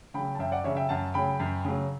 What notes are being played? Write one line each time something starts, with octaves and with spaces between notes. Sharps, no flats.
C#3 F#3 G5 B5
A5
F#2 E5 G5
D5 F#5
C#3 F#3 C#5 E5
E5 G5
F#2 F#5 A5
C#3 F#3 G5 B5
F#2
C#3 F#3